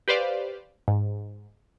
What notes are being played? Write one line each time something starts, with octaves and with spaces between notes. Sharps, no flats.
G4 B4 C5 D5 F5
G#2